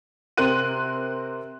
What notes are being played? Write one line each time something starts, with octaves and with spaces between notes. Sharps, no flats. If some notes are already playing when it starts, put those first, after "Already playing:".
C3 C4 A#4 C6 F#6 D#7